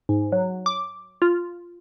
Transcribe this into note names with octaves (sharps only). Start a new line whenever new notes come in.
G#2
F#3
D6
F4